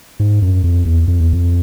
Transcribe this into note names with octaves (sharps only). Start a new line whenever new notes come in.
G#2
F#2
F2
E2
F2
E2
F2